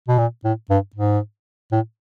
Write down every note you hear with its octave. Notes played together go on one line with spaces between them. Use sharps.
B2
A#2
A2
G2
G#2
A2